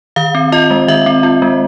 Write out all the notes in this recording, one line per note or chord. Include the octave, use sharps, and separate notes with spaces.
D#3 F5
C4
F4 D#5
G#3
D#3 E5
C4
F4
G#3